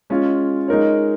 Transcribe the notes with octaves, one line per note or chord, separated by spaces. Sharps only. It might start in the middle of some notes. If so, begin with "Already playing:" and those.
G#3 C#4 F4
G#3 D#4 A#4 C#5